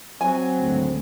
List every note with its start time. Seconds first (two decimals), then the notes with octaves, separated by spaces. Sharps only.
0.21 F#3 C4 G#5
0.59 G#1 D2